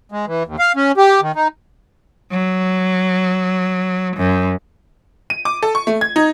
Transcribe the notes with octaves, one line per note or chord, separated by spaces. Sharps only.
G#3
E3
D#2
F5
C#4
G4
D#3
D#4
F#3
F#2
D#7
D6
A4
C#6
A3
G#6
D#4